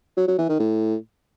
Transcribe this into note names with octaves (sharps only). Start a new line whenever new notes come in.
F#3
F#3
E3
D#3
A2